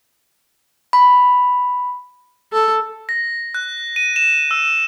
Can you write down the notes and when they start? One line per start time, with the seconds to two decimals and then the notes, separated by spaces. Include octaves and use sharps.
0.93 B5
2.53 A4
3.09 A#6
3.54 F#6
3.96 D#7
4.16 E7
4.51 E6